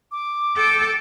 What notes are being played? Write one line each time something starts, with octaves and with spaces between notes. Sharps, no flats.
D6
A4 G5